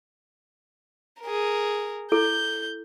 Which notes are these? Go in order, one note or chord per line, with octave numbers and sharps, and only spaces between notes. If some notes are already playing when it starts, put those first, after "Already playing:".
G#4 A#4
E4 A4 G6